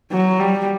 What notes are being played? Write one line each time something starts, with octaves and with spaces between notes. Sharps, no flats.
F#3
G3